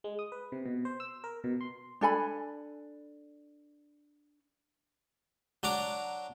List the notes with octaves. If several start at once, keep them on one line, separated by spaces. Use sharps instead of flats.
G#3
D#6
B4
C3
B2
C5
E6
A#4
B2
C6
D4 A4 G#5 B5
F#3 D4 A#5 D6